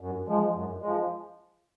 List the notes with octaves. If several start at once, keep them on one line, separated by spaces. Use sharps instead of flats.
F#2
F3 G#3
F#2
F3 G#3